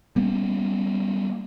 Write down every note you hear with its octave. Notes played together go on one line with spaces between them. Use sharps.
G3 A#3 B3 C#4